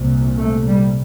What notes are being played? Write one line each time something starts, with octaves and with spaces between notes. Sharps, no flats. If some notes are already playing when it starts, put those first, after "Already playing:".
Already playing: C2 A#2
A3
G3